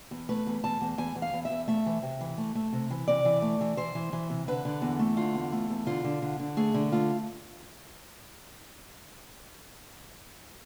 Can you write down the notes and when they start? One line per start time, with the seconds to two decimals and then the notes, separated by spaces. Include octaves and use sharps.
0.11 E2
0.29 A3 B4
0.47 E2
0.64 E2 A5
0.81 E2
0.98 E2 G#5
1.15 E2
1.22 F5
1.33 E2
1.45 E5
1.50 E2
1.68 A3 E5
1.86 E3
2.03 C3
2.21 E3
2.38 A3
2.55 A3
2.73 C3
2.90 E3
3.08 C3 D5
3.25 E3
3.42 A3
3.61 E3
3.77 E3 C5
3.95 E3
4.13 E3
4.30 C3
4.48 D3 B4
4.65 D3
4.82 E2
4.99 A3
5.17 D3 F4
5.34 E2
5.52 A3
5.70 E2
5.87 D3 F4
6.04 D3
6.22 D3
6.40 D3
6.57 A3 G#4
6.74 D3
6.92 A3 F4